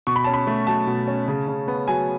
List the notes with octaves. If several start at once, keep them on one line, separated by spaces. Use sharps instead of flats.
B2 C#6
B5
C#4 A5
B5
A3
F#3 A5
B2
C#4
C#3
C#3
B3
F#3 G#5